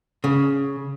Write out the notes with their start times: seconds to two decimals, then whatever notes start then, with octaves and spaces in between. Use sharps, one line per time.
0.24 C#3